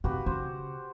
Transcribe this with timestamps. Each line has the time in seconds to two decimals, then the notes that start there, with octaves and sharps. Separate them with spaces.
0.04 C3 F#4 G4 B4
0.26 C#3 C5